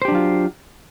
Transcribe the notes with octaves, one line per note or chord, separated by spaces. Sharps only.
F#3 D4 F4 G4 C5